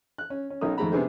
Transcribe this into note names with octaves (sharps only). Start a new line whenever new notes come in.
F#6
C#4
C#4
B1 C#4 D#4 A#4 D#6
F2 D#3 G#3 A3 A#5 B5
C3 B3 D4 G#4 C5